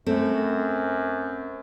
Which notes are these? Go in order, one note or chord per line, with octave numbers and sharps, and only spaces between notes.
F#2 A3 C4